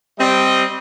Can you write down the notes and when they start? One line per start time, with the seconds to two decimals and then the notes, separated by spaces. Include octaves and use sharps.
0.19 G3 C4 D#5